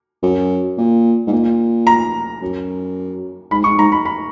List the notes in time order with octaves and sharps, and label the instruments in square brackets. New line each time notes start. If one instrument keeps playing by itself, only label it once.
[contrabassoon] F#2
A#2
G#2
A#2
[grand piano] A#5
[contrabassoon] F#2
[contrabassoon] G#2 [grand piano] B5
[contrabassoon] G#2 [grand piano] C#6
[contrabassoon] G#2 [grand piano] A#5
[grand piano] B5
B5